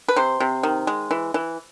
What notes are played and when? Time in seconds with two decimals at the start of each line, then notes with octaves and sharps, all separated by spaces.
0.08 B4
0.16 C3 C5
0.40 C3
0.63 D#3
0.87 G#3
1.11 E3
1.34 E3